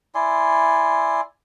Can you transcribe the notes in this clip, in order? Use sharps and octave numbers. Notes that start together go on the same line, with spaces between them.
E4 D5 G#5 C6